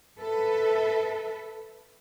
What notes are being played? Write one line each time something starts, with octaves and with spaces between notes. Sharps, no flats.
A4 B4 E5